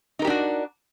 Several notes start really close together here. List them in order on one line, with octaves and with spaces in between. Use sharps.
D#4 A#4 G4 D4 F#4